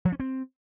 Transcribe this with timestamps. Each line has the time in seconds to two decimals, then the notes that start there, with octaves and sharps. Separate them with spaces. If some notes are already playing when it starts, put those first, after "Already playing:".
0.05 F3
0.12 C#4
0.20 C4